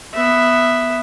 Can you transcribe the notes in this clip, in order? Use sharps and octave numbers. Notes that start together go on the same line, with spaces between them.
B3 E5